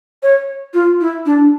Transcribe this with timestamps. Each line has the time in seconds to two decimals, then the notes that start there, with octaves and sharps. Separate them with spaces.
0.23 C#5
0.74 F4
1.01 E4
1.26 D4